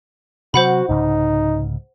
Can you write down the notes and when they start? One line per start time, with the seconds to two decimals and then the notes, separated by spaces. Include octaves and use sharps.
0.54 C3 F#3 F#4 C5 F#5 B5
0.89 C2 G#2 C#3 D#4